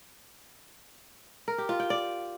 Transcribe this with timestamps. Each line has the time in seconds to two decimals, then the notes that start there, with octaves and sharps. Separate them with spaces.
1.48 A#4
1.58 G4
1.69 F4
1.80 G5
1.90 D5